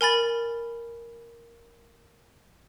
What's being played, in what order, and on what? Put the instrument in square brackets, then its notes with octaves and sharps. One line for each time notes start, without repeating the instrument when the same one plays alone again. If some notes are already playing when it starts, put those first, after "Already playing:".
[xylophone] A#4 G#5 B5 A6